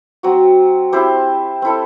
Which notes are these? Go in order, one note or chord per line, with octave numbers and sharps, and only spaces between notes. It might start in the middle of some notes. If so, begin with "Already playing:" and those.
F#3 C4 F#4
C4 E4 G4 C5
C4 E4 A4